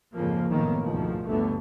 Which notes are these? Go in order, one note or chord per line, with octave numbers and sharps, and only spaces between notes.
F2 G#2 C#3 F3 A#3
F#1 A2 D#3 F#3 A#3 B3
D2 G#2 B2 D#3 F3
G1 D2 D3 A3 B3